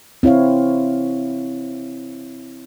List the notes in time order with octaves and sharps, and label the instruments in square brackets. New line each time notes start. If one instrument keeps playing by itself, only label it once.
[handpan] C4 E4 C#5 F5